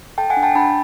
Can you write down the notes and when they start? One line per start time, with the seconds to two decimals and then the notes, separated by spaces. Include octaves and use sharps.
0.18 A4 G5 A5
0.30 F#5 G#5
0.37 D4
0.43 G5 A5
0.55 D4 A5 B5